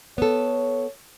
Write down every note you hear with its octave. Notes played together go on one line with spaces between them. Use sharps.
B3 A4 C#5